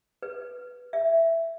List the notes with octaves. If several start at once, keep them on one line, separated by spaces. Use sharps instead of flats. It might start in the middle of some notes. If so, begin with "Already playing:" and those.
B4
E5